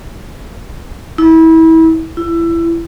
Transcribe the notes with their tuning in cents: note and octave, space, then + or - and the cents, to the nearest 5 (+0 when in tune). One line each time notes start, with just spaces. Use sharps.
E4 -30
E4 +25